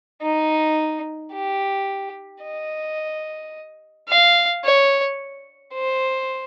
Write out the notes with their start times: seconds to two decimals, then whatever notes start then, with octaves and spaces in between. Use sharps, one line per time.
0.22 D#4
1.33 G4
2.43 D#5
4.09 F5
4.64 C#5
5.74 C5